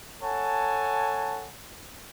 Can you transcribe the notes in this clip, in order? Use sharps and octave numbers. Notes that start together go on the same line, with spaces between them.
A4 C#5 F#5 G#5 A5